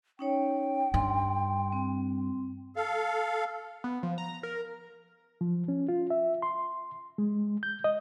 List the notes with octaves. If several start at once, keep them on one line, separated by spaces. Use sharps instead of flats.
C#4 D#4 C#5 G5
G2 C6
C4
A4 F5
B3
F3
A#5
A#4
F3
C#4
F4
E5
C6
G#3
G6
D#5